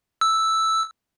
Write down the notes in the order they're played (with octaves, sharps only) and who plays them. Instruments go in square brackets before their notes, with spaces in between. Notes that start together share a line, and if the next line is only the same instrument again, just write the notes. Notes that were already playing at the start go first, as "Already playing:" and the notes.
[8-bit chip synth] E6